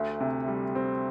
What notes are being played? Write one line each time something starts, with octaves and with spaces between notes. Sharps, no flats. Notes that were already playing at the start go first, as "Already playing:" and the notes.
Already playing: D2 A3
C3
G3
C4